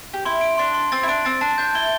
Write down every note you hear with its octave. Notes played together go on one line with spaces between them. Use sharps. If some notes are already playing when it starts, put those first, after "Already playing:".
G4
E4 C6
D7
D4 C6
C6
C4 A6
E4
D4 D7
C4 A6
D4 A5
D4 G6
E4 G7